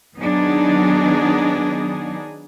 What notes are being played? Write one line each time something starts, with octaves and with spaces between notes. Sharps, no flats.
D#3 F#3 B3 D4 D#4 G#4